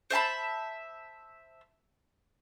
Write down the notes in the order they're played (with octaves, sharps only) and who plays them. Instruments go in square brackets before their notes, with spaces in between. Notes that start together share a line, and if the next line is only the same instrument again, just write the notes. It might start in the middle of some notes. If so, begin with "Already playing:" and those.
[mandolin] C5 E5 A5 B5